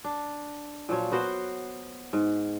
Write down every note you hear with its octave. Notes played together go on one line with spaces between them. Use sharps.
D4
A#2 F3 F#3 C#5
B3 F#4 A#4 C5
G#2